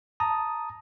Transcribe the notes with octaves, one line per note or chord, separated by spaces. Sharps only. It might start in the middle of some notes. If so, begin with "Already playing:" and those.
A5 A#5 D#6